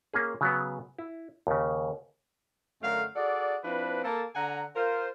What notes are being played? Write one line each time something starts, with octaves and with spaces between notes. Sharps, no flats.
A#3 C#4 G#4
C#3 F#3 B3
E4
D#2 C#3
F#2 D3 F#3 A3 A#4 F5
F#4 G#4 A4 D5
F3 C4 D4 E4 B4
A#3 A4 A5
D3 F#5 G#5 A#5
F4 A#4 C5